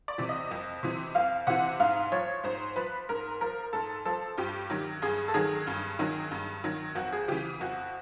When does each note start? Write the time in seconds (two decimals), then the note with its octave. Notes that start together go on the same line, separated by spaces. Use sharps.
0.08 D5
0.18 C3 E3
0.29 D#5
0.51 F2
0.83 C3 E3
1.15 F2 F5
1.47 C3 E3 F#5
1.80 G#2 F5
2.12 F3 C#5
2.44 G#2 C5
2.76 F3 B4
3.09 G#2 A#4
3.41 F3 A#4
3.73 G#2 A4
4.05 F3 A4
4.38 G2 G4
4.70 D#3 F#3
5.02 G2 G#4
5.28 A4
5.34 D#3 F#3 G#4
5.67 G2
5.99 D#3 F#3
6.31 G2
6.64 D#3 F#3
6.95 F2 F#4
7.13 G#4
7.28 C#3 E3 G4
7.61 F2 F#4